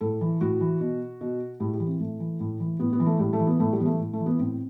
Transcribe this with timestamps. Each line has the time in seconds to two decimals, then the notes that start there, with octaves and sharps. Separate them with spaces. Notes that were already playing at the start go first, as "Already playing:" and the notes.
0.01 A2 A4
0.21 E3
0.41 A2 F#4
0.61 E3
0.81 B2
1.21 B2
1.60 A2 G4
1.73 G4
1.80 E3
1.87 C4
2.00 A2 A3
2.20 E3
2.40 A2
2.60 E3
2.80 A2 B3
2.93 B3
3.00 E3
3.06 A3
3.19 A2 G3
3.33 A3
3.40 E3
3.47 B3
3.60 A2 A3
3.73 G3
3.80 E3 B3
3.86 A3
3.99 A2
4.13 A3
4.20 E3
4.26 B3
4.39 A2 C4